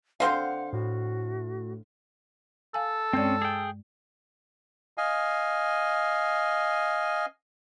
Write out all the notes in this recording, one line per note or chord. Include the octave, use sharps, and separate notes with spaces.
D3 C4 C5 F5 F#5 C6
A2 F#4
A4 F5 G#5
G2 G#3 C4 C#4 D5
G#4 G5
D#5 F5 G#5